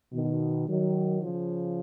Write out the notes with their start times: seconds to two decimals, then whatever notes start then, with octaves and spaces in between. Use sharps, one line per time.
0.13 B2 D#3
0.68 D#3 F#3
1.23 C#3 F3